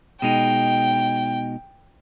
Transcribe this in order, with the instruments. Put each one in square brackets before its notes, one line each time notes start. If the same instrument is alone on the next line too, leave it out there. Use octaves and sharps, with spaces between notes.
[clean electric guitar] B2 G#3 D#4 [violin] G5